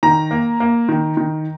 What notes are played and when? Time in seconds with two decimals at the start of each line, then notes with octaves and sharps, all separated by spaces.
0.03 D#3 A#5
0.31 A#3
0.60 A#3
0.89 D#3
1.17 D#3